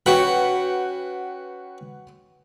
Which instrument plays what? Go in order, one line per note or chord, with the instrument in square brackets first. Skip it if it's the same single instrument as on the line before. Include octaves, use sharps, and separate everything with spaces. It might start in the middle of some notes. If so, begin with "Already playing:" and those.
[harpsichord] C#4 F#4 B5 [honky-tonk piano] B4 F#5 G5